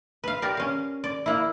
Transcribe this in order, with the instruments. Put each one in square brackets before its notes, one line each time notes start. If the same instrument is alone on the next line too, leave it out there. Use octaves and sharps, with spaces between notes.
[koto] B4 F5
G4 A#4 D5
C#4 F5
D5
A#3 E4